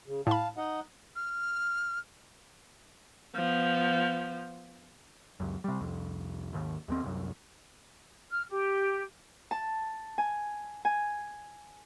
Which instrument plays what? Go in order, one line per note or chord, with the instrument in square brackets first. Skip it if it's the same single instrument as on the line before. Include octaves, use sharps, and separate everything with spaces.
[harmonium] C#3
[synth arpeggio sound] A2 B5 [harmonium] F5 A5
[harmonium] D#4 D#5 F#5
[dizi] F6
[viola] F3 B3
[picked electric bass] C#2 F#2
C3 G3
C2 F2
G#1 D#2
D#2 G#3 C4
C2 F#2
[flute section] F6
G4
[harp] A5
G#5
G#5